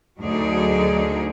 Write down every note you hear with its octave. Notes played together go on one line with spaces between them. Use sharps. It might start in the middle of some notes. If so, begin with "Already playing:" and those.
D2 D3 F#3 D#4 G#4 D5